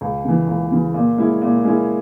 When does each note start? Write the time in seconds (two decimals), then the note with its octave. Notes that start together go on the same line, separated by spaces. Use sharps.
0.01 C#2
0.24 C#3 E3
0.48 C#2
0.71 C#3 E3
0.94 A#2
1.18 G#3 C#4 E4
1.41 A#2
1.64 G#3 C#4 E4